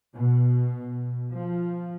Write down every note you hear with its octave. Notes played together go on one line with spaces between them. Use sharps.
B2
F3